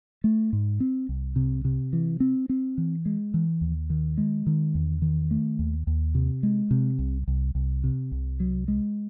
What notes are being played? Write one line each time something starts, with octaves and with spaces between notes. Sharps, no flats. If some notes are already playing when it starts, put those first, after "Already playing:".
A3
G#2
C4
C2
C3
C3
E3
C4
C4
E3
G#3
E3
D#2
D#3
G#3
D#3
E2
D#3
A3
D#2
D#2
C3
G#3
C3
C2
C2
C2
C3
C2
F#3
G#3